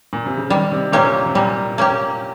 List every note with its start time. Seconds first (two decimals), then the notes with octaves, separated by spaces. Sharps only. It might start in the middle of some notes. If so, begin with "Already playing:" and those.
0.13 A#2
0.26 C3
0.37 C#3
0.50 D#3 G3
0.71 C3
0.92 A#2 A#3 C#4 G4
1.26 C3
1.35 A#2 G3
1.78 A#3 C#4 G4